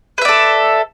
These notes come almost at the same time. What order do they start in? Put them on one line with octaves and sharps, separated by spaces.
B4 E5 D5 A4